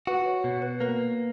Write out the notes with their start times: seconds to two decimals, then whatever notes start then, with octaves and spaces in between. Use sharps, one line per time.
0.07 F#4 B4
0.26 C#5
0.44 B2 C#5
0.62 B4
0.80 A#3 B4